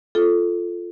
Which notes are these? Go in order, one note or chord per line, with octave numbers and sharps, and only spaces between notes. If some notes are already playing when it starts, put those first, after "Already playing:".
F4 A4